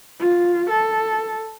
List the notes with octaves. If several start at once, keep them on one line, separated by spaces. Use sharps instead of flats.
F4
A4